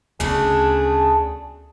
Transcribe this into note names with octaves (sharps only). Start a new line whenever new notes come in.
D2 C#3 A3 B3 D4 G#4